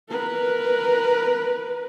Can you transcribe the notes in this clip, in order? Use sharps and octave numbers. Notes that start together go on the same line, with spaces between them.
A#4 B4